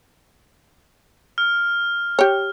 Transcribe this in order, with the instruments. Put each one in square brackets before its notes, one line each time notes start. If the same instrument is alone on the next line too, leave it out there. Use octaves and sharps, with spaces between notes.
[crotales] F6
[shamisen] G4 C#5